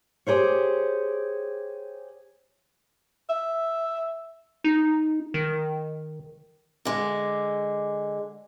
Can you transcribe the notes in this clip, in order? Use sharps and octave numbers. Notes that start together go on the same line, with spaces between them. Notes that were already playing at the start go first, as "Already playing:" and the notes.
G4 G#4 C5 C#5
E5
D#4
D#3
D3 G#3